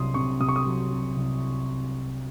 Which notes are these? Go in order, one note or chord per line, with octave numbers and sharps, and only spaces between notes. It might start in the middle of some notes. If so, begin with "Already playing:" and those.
Already playing: C2 C3 F#3 C6 D#6
C3 C#6
C3 D#6
C#6
D#6
F#3
C3
C2